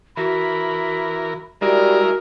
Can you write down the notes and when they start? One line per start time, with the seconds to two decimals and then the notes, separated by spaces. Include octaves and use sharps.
0.17 E3 F#4 A#4 B5
1.62 G3 G#3 D#4 E4 F#4 A#4